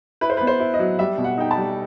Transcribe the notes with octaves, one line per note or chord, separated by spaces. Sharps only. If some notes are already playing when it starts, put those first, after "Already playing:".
E4 B4
C5
B3 B4
C5
E4
D#5
F#3
G3 E5
B2
F#5
D#4 G5
A5
G3